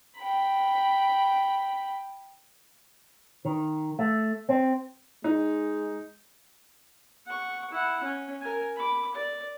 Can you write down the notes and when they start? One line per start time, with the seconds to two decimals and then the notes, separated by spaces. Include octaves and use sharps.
0.18 G5 B5
3.45 D#3
3.99 A3
4.49 C4
5.24 G#3 D#4
7.26 F#5 C#6
7.71 E4 F#5
8.03 C#4
8.41 A#4 G#5
8.76 B5 D6
9.15 D5